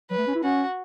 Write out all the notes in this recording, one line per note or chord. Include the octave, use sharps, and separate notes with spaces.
F#3 B4
A3
C#4
E4
C#4 F#4